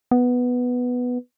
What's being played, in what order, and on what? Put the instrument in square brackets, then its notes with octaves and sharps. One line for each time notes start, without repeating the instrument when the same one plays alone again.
[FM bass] B3